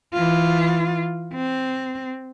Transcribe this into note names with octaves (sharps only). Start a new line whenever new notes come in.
E3 F4
C4